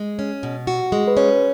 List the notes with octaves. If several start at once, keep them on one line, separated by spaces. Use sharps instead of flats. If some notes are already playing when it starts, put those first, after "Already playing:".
Already playing: G#3
C#4
B2
F#4
G#3
B4
C#4 C#5